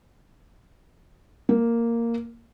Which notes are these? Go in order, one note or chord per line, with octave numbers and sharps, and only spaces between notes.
A#3